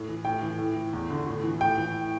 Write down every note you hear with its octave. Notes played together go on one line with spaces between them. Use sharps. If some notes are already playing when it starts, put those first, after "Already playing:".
Already playing: A2
E3
A2 G5
E3
A2
E3
E2
D3
A2
E3
A2 G5
E3